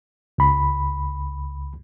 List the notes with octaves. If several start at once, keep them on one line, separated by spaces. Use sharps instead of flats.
C#2 B5